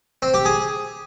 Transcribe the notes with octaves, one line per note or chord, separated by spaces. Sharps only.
C4
G4
G#4